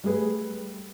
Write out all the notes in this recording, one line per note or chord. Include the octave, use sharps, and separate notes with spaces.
G3 A3 G#4 B4